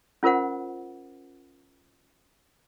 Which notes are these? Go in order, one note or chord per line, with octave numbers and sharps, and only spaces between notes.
C#4 F4 A#4 C5 F#5